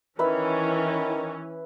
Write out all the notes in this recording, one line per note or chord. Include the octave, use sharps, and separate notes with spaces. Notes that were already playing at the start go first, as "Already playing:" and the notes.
D#3 E3 C#4 B4 E5